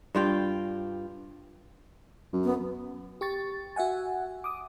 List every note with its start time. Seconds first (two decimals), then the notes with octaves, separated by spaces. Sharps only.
0.15 G2 F4 G5
2.33 F#2
2.44 B3
3.21 G4 C#6 A6
3.76 F#4 E5 F#5 G#5
4.44 D6 D#6